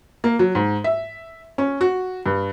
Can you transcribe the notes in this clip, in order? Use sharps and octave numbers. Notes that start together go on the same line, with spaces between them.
A#3
F#3
G#2
E5
C#4
F#4
G2